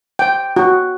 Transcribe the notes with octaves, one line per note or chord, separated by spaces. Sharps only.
G5
F#4